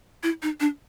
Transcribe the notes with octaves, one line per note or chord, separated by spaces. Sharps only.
E4
D#4
D4